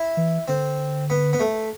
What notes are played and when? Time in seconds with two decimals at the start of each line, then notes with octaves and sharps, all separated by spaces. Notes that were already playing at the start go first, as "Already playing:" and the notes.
Already playing: E4
0.17 E3
0.48 D3 C4
1.10 B3
1.33 B3
1.40 A3